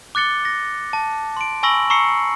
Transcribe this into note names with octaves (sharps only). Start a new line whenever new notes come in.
D6 F#6 A6 C#7 G7
A#6
A5
C6 D7
G#5 B5 C#6 E6 A#6 F#7
A#5 C#6 E6 C7 C#7